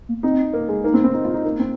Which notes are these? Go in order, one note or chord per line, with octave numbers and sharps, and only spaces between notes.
A#3
C4 D#4
A#3
G#3
A#3 D#4
C4
C4
D#4
F4
D#4
A#3 D#4
C4